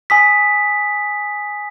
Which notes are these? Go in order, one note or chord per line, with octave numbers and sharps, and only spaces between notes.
G#5 D#6 B6